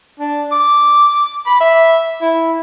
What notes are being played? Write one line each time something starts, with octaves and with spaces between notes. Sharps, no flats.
D4
D6
B5
E5
E4